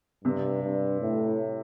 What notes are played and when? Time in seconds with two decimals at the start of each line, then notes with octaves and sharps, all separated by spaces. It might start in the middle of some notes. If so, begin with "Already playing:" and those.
0.24 G2 C3
0.63 G2
1.01 A2